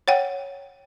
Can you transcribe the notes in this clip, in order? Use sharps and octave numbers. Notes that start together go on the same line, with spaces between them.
C#5 F#5 G5